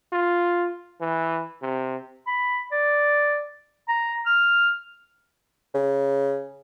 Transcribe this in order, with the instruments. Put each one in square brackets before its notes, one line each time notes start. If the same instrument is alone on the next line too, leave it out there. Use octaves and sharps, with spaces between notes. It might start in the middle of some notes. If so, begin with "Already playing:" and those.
[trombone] F4
E3
C3
[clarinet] B5
D5
A#5
F6
[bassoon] C#3